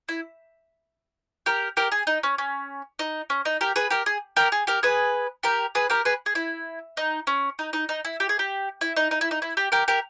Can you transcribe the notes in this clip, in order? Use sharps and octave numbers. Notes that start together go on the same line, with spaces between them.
E4
G4 A#4
G4 A#4
G#4
D#4
C#4
C#4
D#4
C#4
D#4
G4 A#4
G#4 B4
G4 A#4
G#4
G4 A#4
G#4
G4 A#4
G#4 B4
G4 A#4
G#4 B4
G4 A#4
G#4 B4
G#4
E4
D#4
C#4
D#4
D#4
D#4
E4
G4
G#4
G4
E4
D#4
D#4
E4
D#4
E4
G4
G4 A#4
G4 A#4